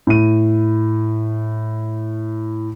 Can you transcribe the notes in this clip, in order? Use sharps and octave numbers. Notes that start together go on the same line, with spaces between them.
A2 D#7